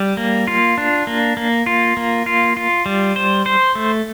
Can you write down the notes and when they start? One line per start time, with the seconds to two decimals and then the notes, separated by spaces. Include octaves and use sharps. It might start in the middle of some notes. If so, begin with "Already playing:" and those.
Already playing: G3
0.17 A#3
0.47 F4
0.78 D4
1.07 A#3
1.37 A#3
1.66 F4
1.97 A#3
2.26 F4
2.57 F4
2.86 G3
3.16 C5
3.46 C5
3.75 A3